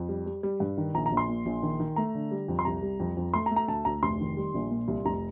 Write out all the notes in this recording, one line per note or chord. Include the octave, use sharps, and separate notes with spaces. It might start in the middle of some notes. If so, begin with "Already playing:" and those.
Already playing: F2
G3
G3
G3
G2
D#3
A#1 A#5
A#5
A#1
C6
A#2
A#1
D#3
D#3
A3 A#5
D3
G3
F2
C6
C2 A#5
G3
F2
F2
A3 C6
A#5
A3
A#5
D2 A5
D2 A#5
F1 C6
D#3
G3
A#1
A#2
C2
F1 A#5